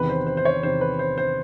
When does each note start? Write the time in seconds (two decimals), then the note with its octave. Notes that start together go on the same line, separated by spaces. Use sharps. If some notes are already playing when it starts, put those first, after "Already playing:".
Already playing: E2 C3 D#3 B4
0.09 C5
0.27 C5
0.37 C5
0.45 C#5
0.63 E2 C3 D#3 C5
0.81 B4
0.99 C5
1.18 C5